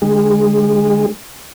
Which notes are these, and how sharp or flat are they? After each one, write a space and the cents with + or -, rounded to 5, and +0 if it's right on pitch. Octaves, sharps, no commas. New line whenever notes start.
D3 +0 G#3 +0 G#4 -35